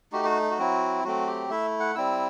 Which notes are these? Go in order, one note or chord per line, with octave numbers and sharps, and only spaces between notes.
A3 D#4 F#4 G4
F#4
F#4
F#3 C4 E4
F#3 A3 C4 F#4
G4
A3 E4 E5
F#5
G3 C4 E4 E6